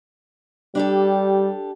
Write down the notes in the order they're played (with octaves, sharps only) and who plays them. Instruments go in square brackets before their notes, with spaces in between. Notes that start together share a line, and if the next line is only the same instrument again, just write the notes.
[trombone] G3 [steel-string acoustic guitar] D4 G4 A4